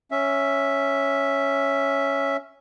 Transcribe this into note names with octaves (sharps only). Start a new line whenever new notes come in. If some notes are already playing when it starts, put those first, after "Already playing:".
C#4 E5